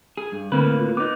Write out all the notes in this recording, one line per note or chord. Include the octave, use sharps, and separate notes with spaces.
G#4
G2
A2 D3 A#3 C4 B4
F4
B3 D#4 D6